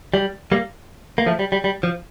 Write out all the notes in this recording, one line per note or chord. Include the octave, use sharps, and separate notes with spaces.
G3
G3 A#3
A#3
F3 A3
G3
G3
G3
F3